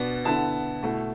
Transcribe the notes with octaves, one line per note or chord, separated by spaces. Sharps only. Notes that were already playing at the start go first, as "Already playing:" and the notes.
Already playing: B2 B3 D4
D3 B3 E4 A5
B2 A3 E4